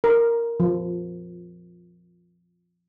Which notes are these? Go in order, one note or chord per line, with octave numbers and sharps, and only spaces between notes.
A#4
F3